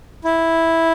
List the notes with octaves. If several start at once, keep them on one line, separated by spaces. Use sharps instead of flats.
E4